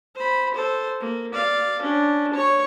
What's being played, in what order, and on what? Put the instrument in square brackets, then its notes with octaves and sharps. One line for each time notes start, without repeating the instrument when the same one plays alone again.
[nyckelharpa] C5 B5
A4 C5
A#3
D5 F5
C#4 D4
C#5 C#6